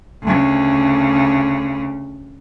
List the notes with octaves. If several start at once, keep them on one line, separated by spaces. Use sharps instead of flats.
D2 C#3